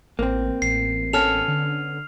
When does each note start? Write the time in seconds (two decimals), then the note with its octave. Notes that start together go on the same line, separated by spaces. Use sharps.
0.19 A1 A#3 C4
0.62 A1 C7
1.13 B3 C#4 A4 F6 F7
1.48 D3